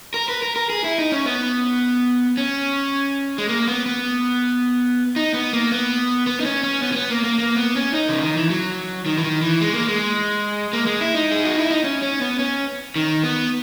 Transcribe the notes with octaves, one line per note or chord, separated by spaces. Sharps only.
A#4
B4
A#4
A#4
G#4
E4
D#4
C#4
B3
C#4
G#3
A#3
B3
B3
D#4
B3
A#3
B3
B3
D#4
C#4
C#4
B3
C#4
B3
A#3
A#3
A#3
B3
C#4
D#4
C#3
D#3
E3
F#3
D#3
E3
D#3
E3
G#3
A#3
G#3
A#3
G#3
E4
D#4
G#4
F#4
E4
D#4
C#4
C#4
B3
C#4
D#3
B3